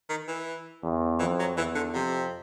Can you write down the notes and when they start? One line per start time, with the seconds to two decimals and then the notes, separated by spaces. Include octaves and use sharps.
0.10 D#3
0.28 E3
0.84 E2
1.20 F2 E3
1.39 F#3
1.57 E2 E3
1.75 D3
1.94 F2 C3